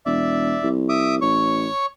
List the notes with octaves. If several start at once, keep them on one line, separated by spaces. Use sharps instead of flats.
E1 D5 E5
C2
E5 D6 D#6
A1 C#5 C#6